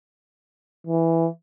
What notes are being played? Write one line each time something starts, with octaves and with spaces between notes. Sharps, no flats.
E3